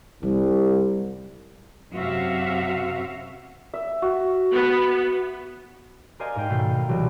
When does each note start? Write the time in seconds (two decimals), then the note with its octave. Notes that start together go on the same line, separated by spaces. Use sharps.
0.23 C2 G3
1.95 F#2 C3 F#4 E5 F5
3.74 E5
4.02 F#4
4.51 B3
6.19 A#4 C5 D5 D#5 F5 G#5
6.36 G#2 A#4 G5
6.49 B2 D#3 A3 G6 C7
6.74 A#4
6.89 C2 A#2 E3 F#3